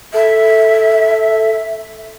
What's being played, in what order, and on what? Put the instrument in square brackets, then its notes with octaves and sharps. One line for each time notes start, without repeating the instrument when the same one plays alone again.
[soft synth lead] A4 [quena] E5